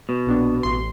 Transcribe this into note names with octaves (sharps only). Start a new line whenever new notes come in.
B2
A#1 B3 D4
A1 C6